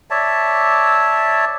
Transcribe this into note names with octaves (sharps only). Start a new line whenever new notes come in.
C#5 D5 E5 A5